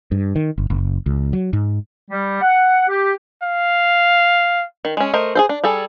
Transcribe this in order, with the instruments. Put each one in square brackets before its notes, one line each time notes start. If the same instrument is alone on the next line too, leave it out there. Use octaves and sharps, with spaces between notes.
[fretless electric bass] G2
D#3
G1
F#1
C#2
F#3
G#2
[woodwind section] G3
F#5
G4
[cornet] F5
[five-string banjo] D#3
G#3 C#4
A3 A#4 C5 D#5
G#4 A4 C5
D4
G3 G#4 A4